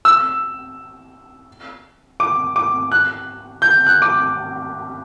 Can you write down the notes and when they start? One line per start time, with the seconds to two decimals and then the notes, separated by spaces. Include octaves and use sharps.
0.05 E6
2.20 D6
2.56 D6
2.92 F#6
3.62 G6
3.87 F#6
4.02 D6